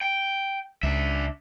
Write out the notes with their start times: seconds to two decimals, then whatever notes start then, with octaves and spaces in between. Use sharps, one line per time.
0.01 G5
0.83 C#2 D4 E5